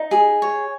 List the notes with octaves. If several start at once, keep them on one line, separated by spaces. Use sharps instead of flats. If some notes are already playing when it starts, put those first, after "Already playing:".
Already playing: D#4
G#4
C#5